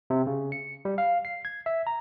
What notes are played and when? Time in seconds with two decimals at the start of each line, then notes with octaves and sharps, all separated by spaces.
0.10 C3
0.27 C#3
0.52 C#7
0.85 G3
0.98 F5
1.25 C7
1.45 G#6
1.66 E5
1.87 A#5